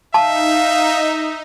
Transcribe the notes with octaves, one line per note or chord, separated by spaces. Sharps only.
D#4 E5 F5 A5